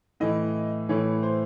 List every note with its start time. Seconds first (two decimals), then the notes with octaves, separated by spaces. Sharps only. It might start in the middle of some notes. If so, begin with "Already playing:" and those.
0.20 A2 E3 D#5
0.89 A2 E3 C#5
1.23 C5